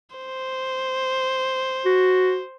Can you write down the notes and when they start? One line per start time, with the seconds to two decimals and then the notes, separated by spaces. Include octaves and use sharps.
0.16 C5
1.86 F#4